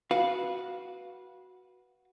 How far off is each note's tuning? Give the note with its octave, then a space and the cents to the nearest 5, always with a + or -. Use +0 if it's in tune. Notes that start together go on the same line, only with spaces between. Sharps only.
F#4 +0 B4 -15 F5 +0